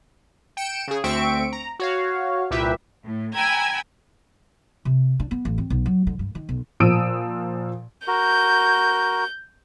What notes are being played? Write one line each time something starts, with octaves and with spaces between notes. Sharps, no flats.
G5 C#7 D7 E7
C#3 G#4
D2 C4 E5 C#6 D7
A#5
F#4 C#5 F5
C2 A#2 G4 B4 E5
A2
G5 G#5 A#5 B5 E6 G#6
C3
D4
B3
A1
C4
B1
F#3
D3
G2
D#3
B1
A#2 F3 D#6 E6 D7 D#7
F#4 A#4 G6